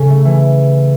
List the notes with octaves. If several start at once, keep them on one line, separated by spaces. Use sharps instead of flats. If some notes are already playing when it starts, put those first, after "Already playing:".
Already playing: C#3 C#4 A4
A3
E3